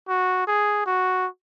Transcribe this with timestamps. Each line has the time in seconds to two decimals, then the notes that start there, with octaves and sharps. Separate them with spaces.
0.08 F#4
0.47 G#4
0.86 F#4